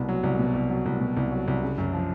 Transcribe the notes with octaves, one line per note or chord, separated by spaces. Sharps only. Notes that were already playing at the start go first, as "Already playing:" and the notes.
Already playing: C2 B2
F#3
C2
B2
C2
F#3
C2
B2
C2
F#3
C2
C#3
F#2
F3